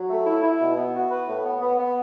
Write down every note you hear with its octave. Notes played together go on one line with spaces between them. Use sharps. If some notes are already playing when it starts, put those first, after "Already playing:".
Already playing: F#3
A3
E4
E4
B2
B3
F#4
B4
A2
B3
B3
B3